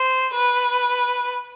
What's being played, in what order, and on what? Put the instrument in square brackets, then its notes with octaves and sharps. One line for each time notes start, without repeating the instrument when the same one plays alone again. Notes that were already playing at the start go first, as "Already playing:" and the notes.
Already playing: [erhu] C5
B4